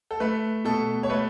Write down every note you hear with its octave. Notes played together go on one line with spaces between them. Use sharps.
A4
A3 B4
B2 A4
C#5
A3 B4